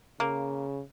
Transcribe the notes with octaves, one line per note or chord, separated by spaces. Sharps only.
C#3 A#3